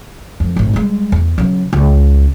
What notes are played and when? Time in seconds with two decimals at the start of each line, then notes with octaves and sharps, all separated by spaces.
0.40 F2
0.56 G#1 A2
0.74 G3 G#3
1.12 E2
1.38 C#3 F#3
1.73 C#2